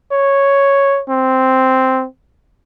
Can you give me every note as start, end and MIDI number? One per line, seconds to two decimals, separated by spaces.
0.12 1.00 73
1.09 2.05 60